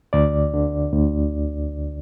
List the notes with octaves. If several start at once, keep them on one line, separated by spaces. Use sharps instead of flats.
D2 D5
D3
D2